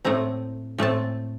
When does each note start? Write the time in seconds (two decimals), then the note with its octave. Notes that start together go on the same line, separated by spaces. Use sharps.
0.05 A2 A3 C4 A#5
0.78 A2 A3 C4 A5